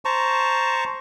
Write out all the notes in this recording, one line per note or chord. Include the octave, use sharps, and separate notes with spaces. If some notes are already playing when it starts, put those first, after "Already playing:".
C5 A5 A#5 C#6